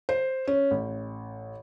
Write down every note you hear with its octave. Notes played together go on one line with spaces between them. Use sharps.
C5
C#4
A1